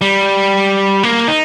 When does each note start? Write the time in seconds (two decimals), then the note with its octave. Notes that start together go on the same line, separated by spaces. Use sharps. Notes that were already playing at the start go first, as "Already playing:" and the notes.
0.01 G3
1.03 A#3
1.28 D#4